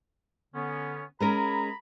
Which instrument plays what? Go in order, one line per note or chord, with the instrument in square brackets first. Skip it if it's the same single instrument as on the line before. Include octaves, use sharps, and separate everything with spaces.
[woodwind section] D3 B3 C#4
[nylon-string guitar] G#3 C#4 A#4 [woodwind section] A#5 B5